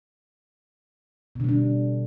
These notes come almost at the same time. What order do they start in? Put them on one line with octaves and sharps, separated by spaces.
B2 D3 G3 D4